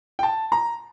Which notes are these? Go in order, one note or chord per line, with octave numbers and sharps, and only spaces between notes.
G5
A5
A#5